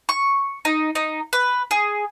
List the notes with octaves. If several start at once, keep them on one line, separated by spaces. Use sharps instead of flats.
C#6
D#4
D#4
B4
G#4